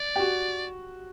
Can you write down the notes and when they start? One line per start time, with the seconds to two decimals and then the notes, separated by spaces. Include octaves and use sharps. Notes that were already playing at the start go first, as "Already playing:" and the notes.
Already playing: D5
0.16 G4
0.20 F#4